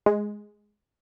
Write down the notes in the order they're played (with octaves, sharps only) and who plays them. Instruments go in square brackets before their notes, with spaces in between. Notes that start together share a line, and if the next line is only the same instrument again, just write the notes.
[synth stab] G#3